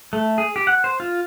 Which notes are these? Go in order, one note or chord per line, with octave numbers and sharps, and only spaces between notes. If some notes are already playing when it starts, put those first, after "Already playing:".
A3
G#4
G4
F#5
C5
F4